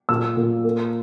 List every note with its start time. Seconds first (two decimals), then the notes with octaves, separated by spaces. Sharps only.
0.09 A#2 E6
0.37 A#2
0.64 A#3